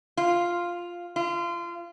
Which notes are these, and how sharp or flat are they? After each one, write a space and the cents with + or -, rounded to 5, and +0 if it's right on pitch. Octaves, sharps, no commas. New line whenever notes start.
F4 +0
F4 -25